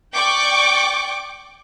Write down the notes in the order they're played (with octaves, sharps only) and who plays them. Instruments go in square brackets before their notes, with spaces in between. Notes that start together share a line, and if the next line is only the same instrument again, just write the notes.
[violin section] D5 G5 C#6 D6